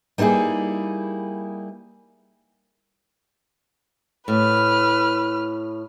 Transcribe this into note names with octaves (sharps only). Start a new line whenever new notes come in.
G3 A#3 D#4 E4 G#4
A2 B4 F6